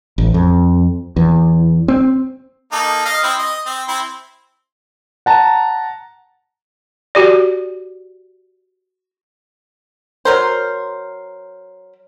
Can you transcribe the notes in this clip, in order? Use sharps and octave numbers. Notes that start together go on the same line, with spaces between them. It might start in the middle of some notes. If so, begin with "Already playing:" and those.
A1
F2
E2
C4
A#3 D#4 A4
D#5 F5
C4 E4
D#5
C4
C4 E4
F#5 A5 A#5
F#4 G4 D5
F#3 A#4 C5